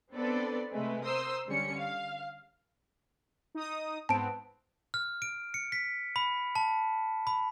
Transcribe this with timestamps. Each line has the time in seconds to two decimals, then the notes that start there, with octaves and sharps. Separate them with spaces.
0.13 B3 C4 D4 A4 B4 D5
0.72 C3 G#3 A3 B4
1.04 A#4 C5 C6 D#6 E6
1.48 D3 G3 C#4 C#7
1.78 F5
3.55 D#4 D#6
4.09 G#2 B3 C4 A5 D7
4.94 F6
5.22 D7
5.54 C#7
5.72 B6
6.16 B5
6.55 A5
7.27 B5